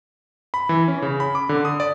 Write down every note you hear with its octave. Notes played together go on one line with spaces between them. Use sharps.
B5
E3
C#4
C#3
B5
D6
D3
D#6
D5